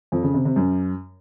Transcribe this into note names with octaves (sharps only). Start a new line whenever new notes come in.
F2
C#3
C3
C3
F#2